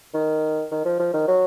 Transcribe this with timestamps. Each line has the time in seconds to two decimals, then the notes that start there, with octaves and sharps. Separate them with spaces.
0.14 D#3
0.71 D#3
0.85 F3
1.00 F3
1.14 D#3
1.28 F#3